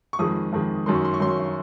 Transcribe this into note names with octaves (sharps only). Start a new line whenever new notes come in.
C#6
F2 D#3 G#3 D#6
F2 D#3 G#3
F#2 D#3 F#3 C6
C#6
C6
C#6
F#2 D#3 F#3 C6